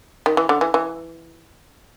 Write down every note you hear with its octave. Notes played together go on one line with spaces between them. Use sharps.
D#3
E3
D3
E3
E3